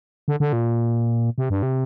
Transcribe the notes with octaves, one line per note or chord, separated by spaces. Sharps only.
D3
D3
A#2
C3
G2
C3